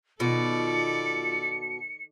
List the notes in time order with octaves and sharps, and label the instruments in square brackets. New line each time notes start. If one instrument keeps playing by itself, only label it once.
[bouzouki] B2 [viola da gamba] D#3 A4 D5 [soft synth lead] F4 [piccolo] C#7